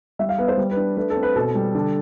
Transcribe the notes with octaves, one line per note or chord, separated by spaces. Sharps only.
G3 E5
F5
B3 B4
C5
G3
B4
D4
A3 B4
A4
C4
B4
B2 A4
G3
D3